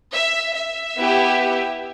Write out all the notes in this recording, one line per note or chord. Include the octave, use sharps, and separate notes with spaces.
E5
E5
B3 E4 G4